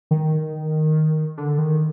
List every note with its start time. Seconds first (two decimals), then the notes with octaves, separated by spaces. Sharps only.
0.11 D#3
1.37 D3
1.58 D#3